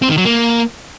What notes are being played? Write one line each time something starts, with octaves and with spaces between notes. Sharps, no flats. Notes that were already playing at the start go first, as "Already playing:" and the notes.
C4
D#3
F#3
A#3